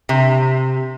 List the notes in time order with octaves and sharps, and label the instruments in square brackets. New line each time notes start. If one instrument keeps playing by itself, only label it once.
[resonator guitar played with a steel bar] C3